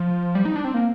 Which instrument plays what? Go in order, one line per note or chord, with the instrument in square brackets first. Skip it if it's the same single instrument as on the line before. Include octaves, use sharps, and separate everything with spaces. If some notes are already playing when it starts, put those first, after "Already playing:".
Already playing: [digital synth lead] F3
G3
D#4
D4
C4
A#3